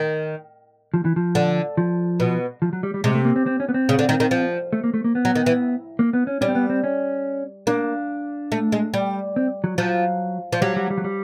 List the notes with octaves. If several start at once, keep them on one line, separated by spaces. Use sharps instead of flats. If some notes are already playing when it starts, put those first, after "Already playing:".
Already playing: D#3
F3
E3
F3
D3
F3
B2
F3
F#3
G3
G3
C3 G#3
A3
A#3
C4
C4
C#4
B3
C4
C#3
D3
D#3
D#3
F3
A3
A#3
A3
A#3
B3
F#3
D#3
E3
A#3
B3
C#4
G3 C#4
C4
B3
C4
C#4
A#3 D4
A3
G#3
G3
C4
F#3
F3 F#3
F3
F#3 G3
G3
G3
F#3
G3